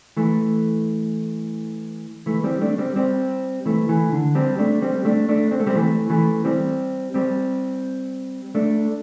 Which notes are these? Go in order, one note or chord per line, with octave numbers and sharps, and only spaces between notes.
E3 A3
E3 A3
G3 C4
A3 D4
G3 C4
G3 C4
E3 A3
E3 A3
D3
G3 C4
A3 D4
G3 C4
A3 D4
A3 D4
C4
A3
G3 C4
E3 A3
E3 A3
G3 C4
G3 C4
A3 D4